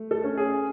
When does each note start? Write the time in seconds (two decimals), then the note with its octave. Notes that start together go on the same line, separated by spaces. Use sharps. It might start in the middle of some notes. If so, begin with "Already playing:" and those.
Already playing: A3
0.11 A4
0.24 C#4
0.37 G#4